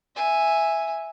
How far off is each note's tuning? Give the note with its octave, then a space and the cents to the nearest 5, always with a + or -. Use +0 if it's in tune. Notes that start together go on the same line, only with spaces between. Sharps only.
E5 +0 G#5 -5